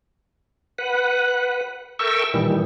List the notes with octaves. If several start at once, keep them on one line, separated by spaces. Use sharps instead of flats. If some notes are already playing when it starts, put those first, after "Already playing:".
B4 F#5
A4 A#4 E5 G5 C#6 E6
A#2 D#3 E3 G3